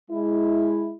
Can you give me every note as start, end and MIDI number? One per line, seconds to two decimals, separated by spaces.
0.11 0.93 56
0.11 0.93 64